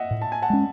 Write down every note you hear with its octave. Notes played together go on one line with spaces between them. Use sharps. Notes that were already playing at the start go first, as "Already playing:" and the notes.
Already playing: D#5 E5 F#5
A2
A5
G#5
F#5 A5
G#3 C#4